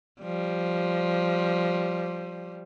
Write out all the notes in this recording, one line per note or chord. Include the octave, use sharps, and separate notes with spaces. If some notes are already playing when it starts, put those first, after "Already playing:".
F3 G3